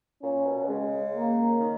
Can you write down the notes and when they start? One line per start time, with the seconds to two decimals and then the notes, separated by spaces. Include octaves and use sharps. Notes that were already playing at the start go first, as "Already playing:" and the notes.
0.23 A#2 C#4
0.46 B2
0.64 B2
0.68 C#3 G#3
1.15 A#3
1.61 D#3